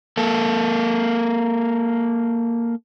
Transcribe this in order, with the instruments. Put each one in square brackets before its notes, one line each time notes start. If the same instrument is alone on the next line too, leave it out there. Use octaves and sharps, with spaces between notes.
[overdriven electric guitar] A#3 A4